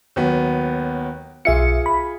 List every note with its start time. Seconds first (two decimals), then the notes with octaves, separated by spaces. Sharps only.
0.16 D#2 F#3 B3
1.45 B1 F4 G#4 E5 C#7
1.86 B5